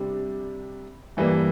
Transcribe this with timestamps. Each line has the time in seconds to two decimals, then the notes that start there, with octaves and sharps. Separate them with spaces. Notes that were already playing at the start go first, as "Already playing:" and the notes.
Already playing: C3 G3 D4
1.17 G2 E3 G3 A#3